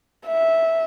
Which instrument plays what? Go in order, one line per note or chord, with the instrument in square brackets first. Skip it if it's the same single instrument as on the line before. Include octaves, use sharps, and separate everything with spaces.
[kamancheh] E5